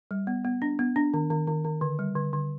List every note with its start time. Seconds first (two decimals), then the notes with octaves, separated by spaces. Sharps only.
0.11 G3
0.27 B3
0.45 B3
0.62 D4
0.79 B3
0.96 D4
1.14 D#3
1.30 D#3
1.47 D#3
1.64 D#3
1.81 D3
1.99 G3
2.16 D3
2.33 D3